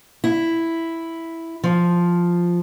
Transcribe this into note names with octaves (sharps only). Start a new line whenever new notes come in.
E4
F3